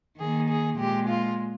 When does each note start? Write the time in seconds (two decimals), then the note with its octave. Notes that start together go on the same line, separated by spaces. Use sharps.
0.19 D#3 A#3 G#4
0.49 G#4
0.78 A#2 G#3 G4
1.08 F4